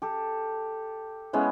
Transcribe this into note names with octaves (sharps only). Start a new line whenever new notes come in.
G4 A4
G#3 B3 C#4 E4